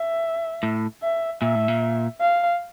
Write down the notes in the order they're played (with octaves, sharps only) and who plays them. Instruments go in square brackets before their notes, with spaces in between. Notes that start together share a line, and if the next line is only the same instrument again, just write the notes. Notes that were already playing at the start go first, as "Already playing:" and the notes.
Already playing: [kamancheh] E5
[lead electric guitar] A2
[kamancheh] E5
[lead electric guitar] A#2 [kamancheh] E5
[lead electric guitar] A2
A#2
[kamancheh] F5